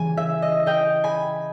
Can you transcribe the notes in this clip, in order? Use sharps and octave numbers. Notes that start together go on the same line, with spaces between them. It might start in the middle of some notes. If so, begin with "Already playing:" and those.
Already playing: C#3 E3 G3 G#5
E5
D#5
D#5 G5
G#5 B5